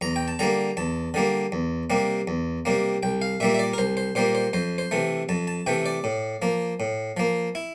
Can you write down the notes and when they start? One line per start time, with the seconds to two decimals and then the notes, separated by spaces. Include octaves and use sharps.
0.01 E2 A#5
0.16 G5
0.28 A5
0.39 D3 G3 A#3 A#5
0.77 E2 A5
1.14 D3 G3 A#3
1.52 E2
1.90 C3 G3 A#3
2.28 E2
2.65 C3 G3 A#3
3.03 C2 G5
3.22 F5
3.40 A#2 G3 A#3 E5
3.54 E5
3.59 D5
3.73 A#4
3.78 C2 C5
3.97 C5
4.15 A#2 G3 A#3 C5
4.35 C5
4.53 F2 C5
4.78 C5
4.91 C3 E3 A3
5.29 F2 A5
5.47 A5
5.67 C3 E3 A3 G5
5.86 D5
6.04 A2
6.42 F3 A#3
6.80 A2
7.17 F3 A#3
7.55 E4